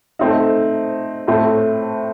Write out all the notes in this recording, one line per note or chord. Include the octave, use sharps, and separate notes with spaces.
A3 C4 D#4
A2 A3 C4